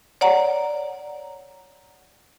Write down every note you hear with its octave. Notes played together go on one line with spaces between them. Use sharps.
C#5 D5 F#5 A#5